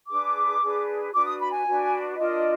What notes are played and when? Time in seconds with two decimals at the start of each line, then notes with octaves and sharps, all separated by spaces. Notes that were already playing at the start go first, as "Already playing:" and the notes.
0.09 D4 G#4 B4 D6
0.61 D4 G#4 B4
1.13 D4 F#4 B4 D6
1.26 D#6
1.39 B5
1.52 G#5
1.65 D4 F#4 B4
2.17 D4 F4 A#4 D#5